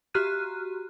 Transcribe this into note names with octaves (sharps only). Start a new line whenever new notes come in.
F#4 G4 A#5 F6 F#6 D#7